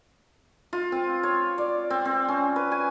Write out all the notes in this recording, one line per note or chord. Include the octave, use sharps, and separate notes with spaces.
F4
C4
C#5
D5
C4
C4
C#4
B4
G#5